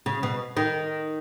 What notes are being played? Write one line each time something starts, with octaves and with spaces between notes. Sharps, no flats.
C#3
B2
D#3